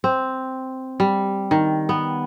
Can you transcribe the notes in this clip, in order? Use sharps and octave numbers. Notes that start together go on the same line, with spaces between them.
C4
G3
D#3
B3